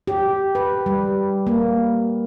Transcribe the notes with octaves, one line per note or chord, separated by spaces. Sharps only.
G4
B4
G3
A#3